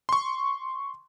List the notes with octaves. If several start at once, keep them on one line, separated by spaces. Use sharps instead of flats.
C6 C#6